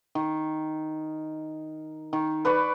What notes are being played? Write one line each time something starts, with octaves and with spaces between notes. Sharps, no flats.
D#3
D#3
B4 D5 B5 C#6